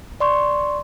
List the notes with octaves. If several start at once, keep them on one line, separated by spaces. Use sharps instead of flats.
D5 C6 C#6